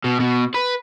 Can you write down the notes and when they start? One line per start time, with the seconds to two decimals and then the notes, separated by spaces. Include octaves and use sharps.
0.04 B2
0.20 B2
0.54 B4